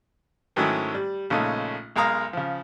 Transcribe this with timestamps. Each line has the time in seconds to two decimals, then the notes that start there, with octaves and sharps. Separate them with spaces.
0.56 G#2 D#3 F#3 A3 C#4 E4
0.94 G3
1.30 A#1 C#3 G#3 A3 C#4 D#4
1.96 B1 G#3 A#4 F5 A#5 D#6
2.33 C#3 F3